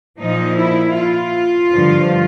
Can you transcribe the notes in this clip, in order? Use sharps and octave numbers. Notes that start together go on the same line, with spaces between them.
A#2 F3 D#4
E4
F4
G2 D3 F3